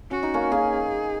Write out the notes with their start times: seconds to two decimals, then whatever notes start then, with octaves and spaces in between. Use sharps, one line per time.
0.11 C#4 F#4
0.23 D#4
0.34 A#3 C#4
0.51 A#3 C#4 G#4